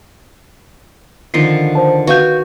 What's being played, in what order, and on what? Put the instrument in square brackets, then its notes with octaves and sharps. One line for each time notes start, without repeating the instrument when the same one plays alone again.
[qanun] D3 D#3 F3 [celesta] C7
[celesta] C5 A5
[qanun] F#4 C#5 G#5 [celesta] B4 F5 G6